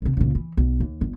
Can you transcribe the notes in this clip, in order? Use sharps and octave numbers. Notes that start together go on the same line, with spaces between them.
C2 C3
C#2 A#2
E3
B1
D#2
G1